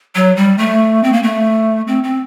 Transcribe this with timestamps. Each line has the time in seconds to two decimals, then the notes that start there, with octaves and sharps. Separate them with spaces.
0.15 F#3
0.36 G3
0.58 A3
1.04 C4
1.13 A#3
1.23 A3
1.88 C4
2.04 C4